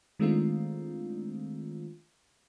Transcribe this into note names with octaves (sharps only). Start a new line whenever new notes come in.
D#3 G#3 A3 C4 D4 F4